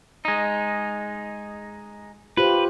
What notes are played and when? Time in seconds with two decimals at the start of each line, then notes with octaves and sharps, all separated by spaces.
0.25 G#3 D#4
2.37 F4 G4 B4 C5